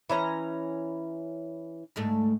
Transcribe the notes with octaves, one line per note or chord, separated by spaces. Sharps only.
E3 C#4 A#5
D2 G#2 A3